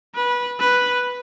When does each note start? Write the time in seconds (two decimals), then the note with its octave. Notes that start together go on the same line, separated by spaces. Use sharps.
0.15 B4
0.60 B4